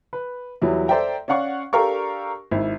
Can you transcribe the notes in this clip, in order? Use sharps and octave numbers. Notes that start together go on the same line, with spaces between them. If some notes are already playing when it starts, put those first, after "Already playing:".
B4
E2 F#3 G3 E4
A4 C5 D5 E5 G5 A#5
C#4 D5 F5 F#5 C#6
D4 G4 A4 A#4 F5 C#6
G#1 E4